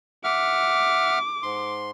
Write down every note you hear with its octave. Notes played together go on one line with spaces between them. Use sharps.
E5 F#5 D6 F6
G#2 C6